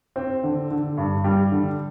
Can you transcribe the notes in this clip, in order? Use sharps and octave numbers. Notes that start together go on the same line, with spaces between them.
C4
D3
D3
G2
G3
D3